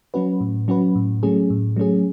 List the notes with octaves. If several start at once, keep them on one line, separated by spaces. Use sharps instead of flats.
F#3 C#4 F#4 B4
A2
F#3 C#4 F#4 B4
A2
F#3 A3 C#4 G#4
A2
F#3 A3 C#4 G#4